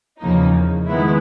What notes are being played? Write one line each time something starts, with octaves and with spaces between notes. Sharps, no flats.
E2 C#3 F3 A#3 D#4
D#3 G#3 B3 E4